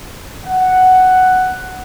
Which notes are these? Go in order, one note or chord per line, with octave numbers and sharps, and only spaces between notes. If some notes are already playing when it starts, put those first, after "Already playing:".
F#5